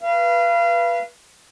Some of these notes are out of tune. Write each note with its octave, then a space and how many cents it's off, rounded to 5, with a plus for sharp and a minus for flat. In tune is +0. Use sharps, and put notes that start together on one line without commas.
B4 -20 F5 -30